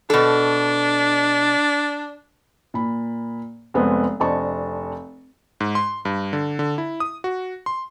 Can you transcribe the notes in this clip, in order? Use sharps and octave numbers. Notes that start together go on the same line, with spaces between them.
B2 D4 A4
A#2 B5
F1 G#3 B3 C4
F1 C4 D4 D#5 A5 C#6
G#2
C6
G2
D3
D3
E4
D#6
F#4
C6